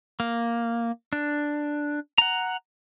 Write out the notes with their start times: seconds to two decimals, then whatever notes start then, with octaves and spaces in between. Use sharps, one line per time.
0.20 A#3
1.13 D4
2.18 F#5 A#5